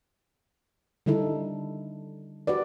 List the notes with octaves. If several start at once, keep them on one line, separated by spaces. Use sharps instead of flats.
D3 G3 D#4 E4 A4
F#4 G4 B4 D5